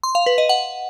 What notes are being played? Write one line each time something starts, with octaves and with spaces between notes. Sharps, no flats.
C6
F5
B4
D#5
F#5